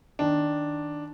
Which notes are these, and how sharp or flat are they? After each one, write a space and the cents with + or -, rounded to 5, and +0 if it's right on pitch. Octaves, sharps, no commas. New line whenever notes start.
D#3 +0 D4 +0